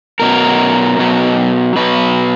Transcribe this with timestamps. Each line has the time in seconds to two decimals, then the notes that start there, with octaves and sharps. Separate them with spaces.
0.20 B2 F#3 A#4
0.99 B2 F#3
1.76 B2 F#3 B4